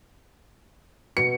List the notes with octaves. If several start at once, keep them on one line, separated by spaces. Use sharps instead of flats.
B2 C#7